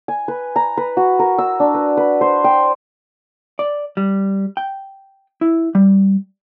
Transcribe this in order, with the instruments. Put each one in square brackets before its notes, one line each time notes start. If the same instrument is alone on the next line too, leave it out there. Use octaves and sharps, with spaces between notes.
[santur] G#5
B4
A#5
B4
F#4
A#4
E6
D4
B4
B4
C5
G5
[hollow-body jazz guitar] D5
G3
G5
E4
G3